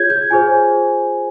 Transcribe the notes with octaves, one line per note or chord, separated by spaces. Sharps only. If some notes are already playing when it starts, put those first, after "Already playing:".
Already playing: F4 G#4 C#5 G6 G#6
G6
F4 G#4 C5 G#5